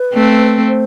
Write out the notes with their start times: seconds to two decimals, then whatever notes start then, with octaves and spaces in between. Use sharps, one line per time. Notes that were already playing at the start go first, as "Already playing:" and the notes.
Already playing: B4
0.14 A3 C4
0.68 C5